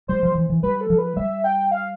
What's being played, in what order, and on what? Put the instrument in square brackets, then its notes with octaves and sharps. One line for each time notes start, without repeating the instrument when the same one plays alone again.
[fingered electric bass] G3 [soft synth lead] C5
[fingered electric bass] F3
E3
E3
[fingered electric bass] G3 [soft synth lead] B4
[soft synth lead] A4
[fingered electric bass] F3
[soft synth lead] B4
[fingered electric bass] G3 [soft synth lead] E5
[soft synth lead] G5
F5